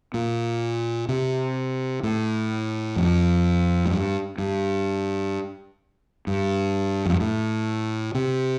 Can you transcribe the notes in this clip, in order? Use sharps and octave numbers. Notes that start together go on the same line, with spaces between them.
A#2
C3
A2
F2
A2
G2
G2
G2
F2
G2
A2
C3